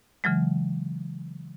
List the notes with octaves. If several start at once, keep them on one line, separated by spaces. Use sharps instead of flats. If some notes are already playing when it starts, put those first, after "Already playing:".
C#3 E3 F#3 G#3